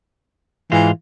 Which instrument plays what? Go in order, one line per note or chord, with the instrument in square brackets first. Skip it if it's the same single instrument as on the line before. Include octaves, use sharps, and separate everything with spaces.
[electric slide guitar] G#2 G#3 F4 [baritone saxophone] E3